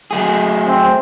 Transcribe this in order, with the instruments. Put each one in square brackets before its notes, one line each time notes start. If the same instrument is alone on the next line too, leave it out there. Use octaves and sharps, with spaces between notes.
[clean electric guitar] F#3 A3 G#4
[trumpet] C4